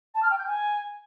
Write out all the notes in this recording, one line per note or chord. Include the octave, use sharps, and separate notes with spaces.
A5
F6
G5
G6
G#5